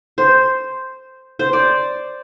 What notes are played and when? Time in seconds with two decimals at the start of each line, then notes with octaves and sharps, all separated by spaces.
0.18 C5
1.39 C5
1.53 D5